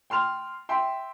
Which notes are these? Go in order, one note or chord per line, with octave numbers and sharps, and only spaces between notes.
G5 C6 F6 F7
E5 G5 C6